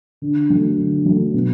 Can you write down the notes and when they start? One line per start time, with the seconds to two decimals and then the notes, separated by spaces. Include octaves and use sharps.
0.22 D3
0.50 F#3 A3
0.78 D3
1.05 F#3 A3
1.34 B2